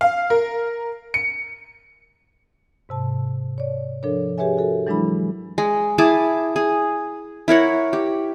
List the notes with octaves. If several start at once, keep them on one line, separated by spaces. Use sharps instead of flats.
F5
A#4
C#7
G#2 C3 A5
C#5 D5
F3 D4 A4 A#4 C#5
G4 G#4 B4 C#5 E5 G#5
F#4 A4 A#4
E3 F#3 G#3 D4 E4 B5
G#3
E4 G#4 A5 D6
G#4
E4 A#4 C#5 F#5
G4